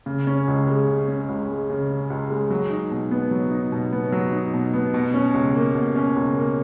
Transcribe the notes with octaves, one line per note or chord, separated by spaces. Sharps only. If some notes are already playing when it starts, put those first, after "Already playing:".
C#3
C#4
C#2
G#3
C#3
C#4
C#2
G#3
C#3
C#4
C#2
G#3
F#3
D#4
B2
B3
F#3
D#4
B2
B3
F#3
D#4
B2
B3
B2
C#4
C#2
A#3
B2
C#4
C#2
A#3